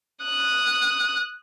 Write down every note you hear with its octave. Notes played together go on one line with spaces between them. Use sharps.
D#6 F#6